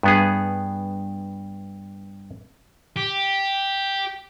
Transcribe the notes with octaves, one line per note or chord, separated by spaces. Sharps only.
G2 B3 G#4
G4